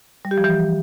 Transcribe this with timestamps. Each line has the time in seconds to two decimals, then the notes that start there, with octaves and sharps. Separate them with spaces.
0.25 G3
0.31 G4
0.38 F3
0.44 E3